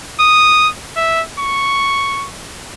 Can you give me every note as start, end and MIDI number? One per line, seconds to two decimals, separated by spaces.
0.20 0.68 87
0.96 1.22 76
1.39 2.26 85